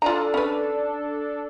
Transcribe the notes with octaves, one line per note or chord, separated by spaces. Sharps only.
D4 F4 A4 A#5
C#4 B4